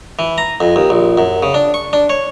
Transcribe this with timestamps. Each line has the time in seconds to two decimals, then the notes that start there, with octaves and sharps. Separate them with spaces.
0.19 E3
0.38 A#5
0.61 F2
0.76 D#2
0.90 A#1
1.18 F#2
1.43 C#3
1.54 D4
1.74 C#6
1.93 D4
2.10 C#5